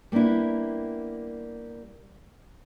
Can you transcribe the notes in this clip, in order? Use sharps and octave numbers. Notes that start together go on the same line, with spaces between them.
G3 A#3 B3 D4 E4